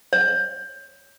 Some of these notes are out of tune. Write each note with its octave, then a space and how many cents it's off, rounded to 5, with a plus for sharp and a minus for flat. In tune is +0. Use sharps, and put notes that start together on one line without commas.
C#5 +5